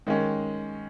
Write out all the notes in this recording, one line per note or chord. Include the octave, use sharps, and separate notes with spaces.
D#3 G#3 C#4